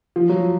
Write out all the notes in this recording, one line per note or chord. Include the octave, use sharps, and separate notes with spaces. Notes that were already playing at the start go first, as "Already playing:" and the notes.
F3
F#3